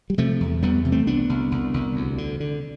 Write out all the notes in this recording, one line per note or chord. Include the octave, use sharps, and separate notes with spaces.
G3
C3 F3 A3
E2
E2 G3 B3
C3
A3 C4
C2 B3 D4
C2
C2
C2
D2
D3
D3